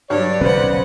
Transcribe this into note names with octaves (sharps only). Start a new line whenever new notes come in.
G2 F#3 C#5 D5
D#1 B1 C#3 C#4 B4 C5 F#5